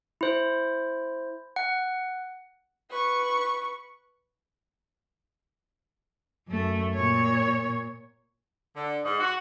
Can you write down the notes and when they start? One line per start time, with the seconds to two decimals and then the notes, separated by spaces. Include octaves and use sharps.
0.21 E4 C5
1.56 F#5
2.91 B4 C#6
6.48 F#2 A3
6.94 A#2 C#5
8.76 D3
9.04 G#2
9.20 F#4